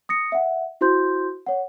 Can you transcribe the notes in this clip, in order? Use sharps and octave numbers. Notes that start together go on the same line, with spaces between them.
D#6 A#6 C#7
E5 F#5
E4 F#4 C5 C6 G6
C#5 F#5